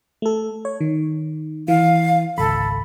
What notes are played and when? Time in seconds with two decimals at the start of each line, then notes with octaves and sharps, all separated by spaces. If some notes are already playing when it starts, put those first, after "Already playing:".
0.22 A3 A4
0.65 C#5
0.81 D#3
1.68 E3 F5
2.38 G#1 C#2 A4 B5